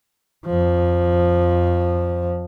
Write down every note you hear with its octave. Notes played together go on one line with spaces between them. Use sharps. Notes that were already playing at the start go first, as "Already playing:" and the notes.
F2 F3